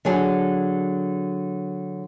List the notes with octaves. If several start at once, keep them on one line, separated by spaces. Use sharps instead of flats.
D3 F#3 G#4